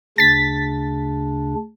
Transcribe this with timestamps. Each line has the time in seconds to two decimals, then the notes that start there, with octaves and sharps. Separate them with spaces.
0.18 D2 C#3 D4 A6 B6